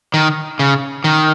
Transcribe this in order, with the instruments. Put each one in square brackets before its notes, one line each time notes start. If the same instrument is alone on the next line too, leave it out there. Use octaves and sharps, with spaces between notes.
[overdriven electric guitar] D#3
C#3
D#3